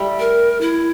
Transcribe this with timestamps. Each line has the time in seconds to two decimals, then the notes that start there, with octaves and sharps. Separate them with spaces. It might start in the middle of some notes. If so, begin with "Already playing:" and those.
Already playing: G3 A3
0.19 A#4
0.61 E4